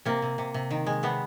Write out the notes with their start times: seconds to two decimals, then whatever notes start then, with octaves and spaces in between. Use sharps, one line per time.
0.05 C3 A#3
0.22 C3
0.38 C3
0.54 C3
0.71 D#3
0.86 G#3
1.03 C3 B3